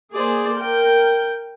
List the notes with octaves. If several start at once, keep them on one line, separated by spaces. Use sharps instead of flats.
A#3 G#4 C5 D5
A#4 G5